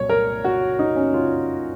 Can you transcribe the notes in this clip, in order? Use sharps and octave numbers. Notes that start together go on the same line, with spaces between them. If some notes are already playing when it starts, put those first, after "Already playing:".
Already playing: C2 A#2 F#3 C#5
A#4
F#4
D#4
C#4
F4